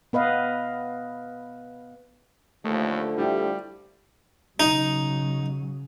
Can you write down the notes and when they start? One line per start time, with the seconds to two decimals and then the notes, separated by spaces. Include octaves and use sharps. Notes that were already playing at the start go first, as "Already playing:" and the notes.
0.13 B3 B4 D#5 F5
2.64 D#2 D3 F3 A3
3.17 G3 E4 G4
4.60 C#3 F#3 D#4